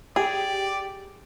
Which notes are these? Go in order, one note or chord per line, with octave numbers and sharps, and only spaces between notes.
G4 G#4 D5